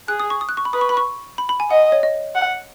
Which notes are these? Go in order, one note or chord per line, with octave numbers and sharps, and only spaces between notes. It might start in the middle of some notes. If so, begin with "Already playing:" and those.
G#4 F#6
D#6
C#6
D#6
F#6
C#6
B5
B4 D#6
C#6
B5
C#6
B5
B5
G#5
D#5 F#5
C#5
D#5
F#5